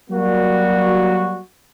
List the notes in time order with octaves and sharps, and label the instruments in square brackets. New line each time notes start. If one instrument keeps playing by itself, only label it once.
[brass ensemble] F#3 G3 A#3 F#4